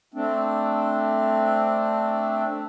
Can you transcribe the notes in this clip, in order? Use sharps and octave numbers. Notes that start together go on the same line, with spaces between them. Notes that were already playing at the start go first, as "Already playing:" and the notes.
A3 C4 D4